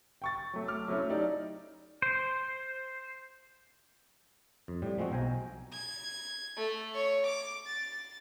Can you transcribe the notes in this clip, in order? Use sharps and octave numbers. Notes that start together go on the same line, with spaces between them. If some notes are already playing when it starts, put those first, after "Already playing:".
G5 C#6 A6
F#3 A3
D6 F6
F#3 A3 C#4 E4
D#4 G4 D5
C5
F2
A2 G3
F3 G#3 C4 F#4
B1 G5 G#5 A#5
G#6
A3
C#5
D6
A6